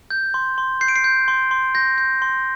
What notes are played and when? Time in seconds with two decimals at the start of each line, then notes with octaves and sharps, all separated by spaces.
0.10 G6
0.34 C6
0.58 C6
0.81 G6 C7
0.88 D7
0.96 C7
1.04 G6
1.28 C6
1.51 C6
1.75 G6 A#6
1.98 G6
2.22 C6